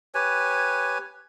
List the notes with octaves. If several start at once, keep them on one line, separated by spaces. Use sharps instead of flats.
G4 B4 C#5 G#5